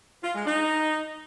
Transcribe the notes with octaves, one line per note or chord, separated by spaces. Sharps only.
F4
G#3
D#4